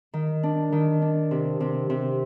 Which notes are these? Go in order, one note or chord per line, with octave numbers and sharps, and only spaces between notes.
D#3
D4
D#3
D4
C3
C3
C3